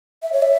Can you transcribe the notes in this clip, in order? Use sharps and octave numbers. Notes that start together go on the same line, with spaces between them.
E5
C#5
E5